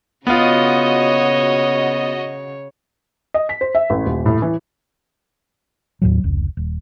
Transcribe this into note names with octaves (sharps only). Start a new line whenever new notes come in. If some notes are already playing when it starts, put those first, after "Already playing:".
C#3 B3 F4 F#4 C#5 D#5
D#5
B6
C5
E5
A1
D#1
A2
E3
D#2 A2 F#3
F1 C#2
D#1